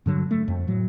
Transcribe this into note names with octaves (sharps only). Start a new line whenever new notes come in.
G2 D3 F#3
A3
F2
A2 F#3